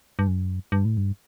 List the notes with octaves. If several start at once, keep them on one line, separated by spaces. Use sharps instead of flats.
G2
F#2
G2
A2
G2